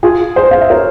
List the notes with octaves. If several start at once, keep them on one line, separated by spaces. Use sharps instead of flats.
F4 G#4
G#4 C5
F5
E5
A#4 C#5